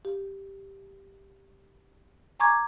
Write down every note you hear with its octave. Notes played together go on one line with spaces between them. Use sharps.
G4
G#5 A#5 C#6 D6 G#6